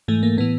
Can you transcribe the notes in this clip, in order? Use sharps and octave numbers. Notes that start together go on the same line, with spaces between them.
G#2 E3 A3
A#3
A2 E3 B3